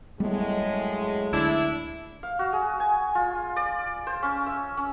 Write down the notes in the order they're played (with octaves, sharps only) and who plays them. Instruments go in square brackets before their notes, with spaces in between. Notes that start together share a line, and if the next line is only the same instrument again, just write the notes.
[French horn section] F#2 A2 G#3 [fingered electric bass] G3 B3
[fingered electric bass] D2 [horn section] D4 E4
[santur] F5
F#4
G#4
G#5
F4
D5
C5
C#4
E5
C#4